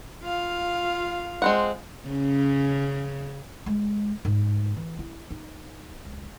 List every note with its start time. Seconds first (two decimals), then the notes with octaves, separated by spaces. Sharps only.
0.23 F4 F5
1.42 G#3 C4 F#5
2.09 C#3 C#4
3.66 G#3
4.25 G#2
4.77 E3
4.99 E4
5.31 D#4
6.05 C#2